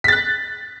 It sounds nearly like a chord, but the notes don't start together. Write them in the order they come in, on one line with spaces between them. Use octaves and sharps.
B6 A6 F#6